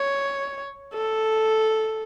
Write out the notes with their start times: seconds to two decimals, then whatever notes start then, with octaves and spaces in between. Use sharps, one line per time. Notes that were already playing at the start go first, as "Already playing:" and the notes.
Already playing: C#5
0.94 A4